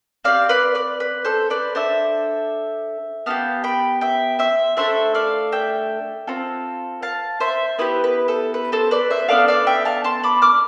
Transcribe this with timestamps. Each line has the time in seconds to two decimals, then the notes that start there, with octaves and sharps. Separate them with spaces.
0.24 C4 G4 D5 F5
0.49 B4 D5
0.75 B4 D5
1.00 B4
1.25 A4 C5
1.50 B4 D5
1.75 D4 A4 C5 E5
3.26 B3 D4 G4 F5 A5
3.64 G5 B5
4.01 E5 G5
4.39 C5 E5
4.77 A3 D4 A4 C5 E5
5.15 D5 F5
5.52 E5 G5
6.27 C4 F4 A4
7.02 F5 A5
7.40 C5 E5
7.79 B3 E4 G4 B4
8.04 B4
8.28 A4
8.54 B4
8.72 A4 C5
8.91 B4 D5
9.10 C5 E5
9.29 B3 D4 A4 D5 F5
9.48 D5 F5
9.67 E5 G5
9.85 F5 A5
10.04 A5 C6
10.23 B5 D6
10.42 D6 F6